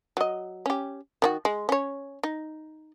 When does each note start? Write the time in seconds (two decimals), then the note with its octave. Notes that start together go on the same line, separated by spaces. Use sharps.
0.17 F#3 D#5
0.66 C#4 G4
1.22 D#3 D4 F#4
1.45 G#3
1.69 C#4 C#5
2.23 D#4